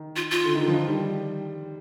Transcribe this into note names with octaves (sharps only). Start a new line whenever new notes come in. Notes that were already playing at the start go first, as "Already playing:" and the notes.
Already playing: D#3
F4
F4
D3
D#3
D3
F3
D#3
G3